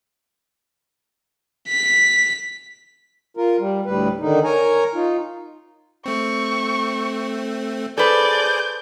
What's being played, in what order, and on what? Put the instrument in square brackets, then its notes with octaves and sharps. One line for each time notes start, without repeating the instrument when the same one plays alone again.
[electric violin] B6
[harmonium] F4 A#4
G3
D2 A2 G3 B4
D3 D#3 D#4
A#4 C#5 G#5 A#5
D#4 F4
[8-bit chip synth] A3 C4 [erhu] C#6
[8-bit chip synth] G#4 C5 G#5 [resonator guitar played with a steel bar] A4 B4 [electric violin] D5 [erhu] G6